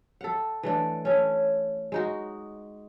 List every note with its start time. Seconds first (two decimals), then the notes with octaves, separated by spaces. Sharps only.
0.21 A4 F#5
0.63 E3 A3 D4
1.05 C#4 A4
1.92 G#3 D#4 F#4